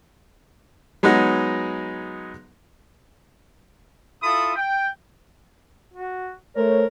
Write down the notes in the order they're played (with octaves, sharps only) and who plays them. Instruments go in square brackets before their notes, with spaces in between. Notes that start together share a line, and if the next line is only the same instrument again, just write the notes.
[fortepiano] F#3 G#3 B3 D#4 F#5
[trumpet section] E4 F4 A4 B5 D#6
G5
[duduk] F#4
[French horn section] A3 C5 C#5 [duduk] A#4